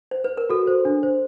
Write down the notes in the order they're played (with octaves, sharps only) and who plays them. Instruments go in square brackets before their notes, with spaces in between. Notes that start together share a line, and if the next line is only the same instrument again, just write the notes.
[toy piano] C5
B4
A#4
[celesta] F#4 [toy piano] A4
[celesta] C5
D4
C5